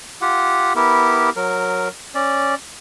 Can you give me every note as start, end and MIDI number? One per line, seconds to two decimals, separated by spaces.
0.21 0.73 65
0.21 0.73 67
0.21 0.73 78
0.76 1.30 59
0.76 1.30 64
0.76 1.30 67
0.76 1.30 70
1.36 1.88 54
1.36 1.88 70
2.15 2.55 61
2.15 2.55 74